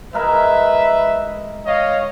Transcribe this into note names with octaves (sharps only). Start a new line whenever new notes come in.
G#3 E4 A#4 B4 E5
C#5 D#5 F5